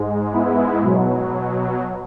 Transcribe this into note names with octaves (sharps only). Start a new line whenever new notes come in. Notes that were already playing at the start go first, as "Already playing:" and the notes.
Already playing: G#2 G#3
B3 E4
B2 F#3